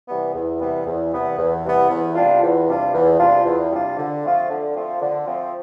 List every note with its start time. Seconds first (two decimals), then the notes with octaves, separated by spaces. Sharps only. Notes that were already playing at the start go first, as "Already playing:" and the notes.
0.08 C3 E3 G3 B3
0.34 E2
0.60 C3 E3 G3 B3
0.86 E2
1.13 C3 E3 G3 B3
1.38 E2
1.64 C3 E3 G3 B3
1.89 E2
2.15 C3 G3 D4 F4
2.42 E2
2.68 C3 G3 D4 F4
2.94 E2
3.20 C3 G3 D4 F4
3.45 E2
3.72 C3 G3 D4 F4
3.98 D3
4.24 F3 A3 C4 F4
4.49 D3
4.75 F3 A3 C4 F4
5.01 D3
5.27 F3 A3 C4 F4